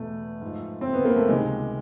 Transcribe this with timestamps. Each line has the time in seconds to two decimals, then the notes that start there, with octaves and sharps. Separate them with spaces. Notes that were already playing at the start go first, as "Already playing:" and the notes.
Already playing: E2 B2 A3
0.41 G#2 F3
0.81 C4
0.93 B3
1.05 A#3
1.16 A3
1.28 C#2 C3 D#3 G#3